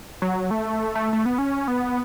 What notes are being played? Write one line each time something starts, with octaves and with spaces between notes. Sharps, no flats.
F#3
A3
A3
A3
B3
C#4
B3